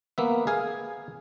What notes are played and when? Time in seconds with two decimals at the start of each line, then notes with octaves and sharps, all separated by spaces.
0.18 A#3 B3 E5
0.47 G#4 F5 G#5